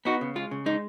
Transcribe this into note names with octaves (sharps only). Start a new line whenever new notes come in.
B3 D#4 F#4
C#3
G#3 F4
C#3
G#3 D#4